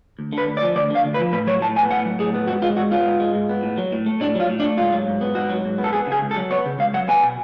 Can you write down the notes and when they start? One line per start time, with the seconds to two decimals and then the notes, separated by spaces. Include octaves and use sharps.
0.19 D2
0.33 D3
0.38 B4
0.47 D2
0.57 D5
0.62 F3
0.75 D2 D5
0.90 D3 F5
1.05 D2
1.14 B4
1.19 F3
1.32 A2 B4
1.47 F#3 C#5
1.62 A2 A5
1.76 B3 G#5
1.90 A2 F#5
2.05 F#3
2.19 A2 G#4
2.34 B3
2.48 G#2 F#4
2.62 G#3 F4
2.77 G#2 F#4
2.91 B3 F4
3.06 G#2
3.20 G#3
3.35 G#2
3.49 B3
3.63 A2
3.78 F#3
3.92 A2
4.06 A3
4.20 A2 D4
4.35 F#3 F4
4.50 A2
4.60 D4
4.64 A3
4.78 G#2 F4
4.92 F#3
5.08 G#2
5.21 B3
5.35 G#2 F#4
5.50 F#3
5.65 G#2
5.78 B3
5.84 A4
5.93 B3 G#4
6.07 C#3 G#4
6.22 C#2
6.31 A4
6.36 F#3
6.51 B3 C#5
6.66 C#3
6.79 C#2 F5
6.94 F#3 F#5
7.08 B3 G#5
7.23 B2